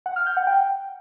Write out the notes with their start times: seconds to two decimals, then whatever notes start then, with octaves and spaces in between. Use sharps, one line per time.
0.06 F#5
0.16 F6
0.26 G6
0.37 F#5
0.47 G5